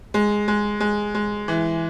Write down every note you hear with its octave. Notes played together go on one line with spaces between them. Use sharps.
G#3
G#3
G#3
G#3
E3